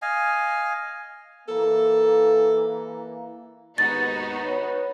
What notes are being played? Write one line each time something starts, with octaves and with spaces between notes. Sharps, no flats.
D#5 F5 G#5
E3 A#3 A4
D#2 G#2 B3 D#4 F#4 A6
B4 C#5